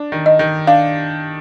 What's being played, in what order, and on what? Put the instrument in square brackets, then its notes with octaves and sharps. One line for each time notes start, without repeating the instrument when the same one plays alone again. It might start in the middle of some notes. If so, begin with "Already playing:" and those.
Already playing: [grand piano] D4
D#3
[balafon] D#5
[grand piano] D#3
[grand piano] D4 [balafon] F5